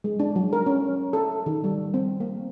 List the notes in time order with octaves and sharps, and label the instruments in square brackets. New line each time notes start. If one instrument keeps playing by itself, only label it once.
[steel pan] G#3
D4
F#3
A#4
C#4
A4
D#3
G3
C4
A#3